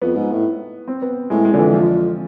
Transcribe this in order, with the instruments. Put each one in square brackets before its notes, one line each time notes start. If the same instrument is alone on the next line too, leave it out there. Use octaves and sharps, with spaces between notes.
[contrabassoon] F2 [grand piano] B3
[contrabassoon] G#2
A2
[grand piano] C4
B3
[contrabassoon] A2 [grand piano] G#3
[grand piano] G#3
[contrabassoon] F2 [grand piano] D3
[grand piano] E3
F3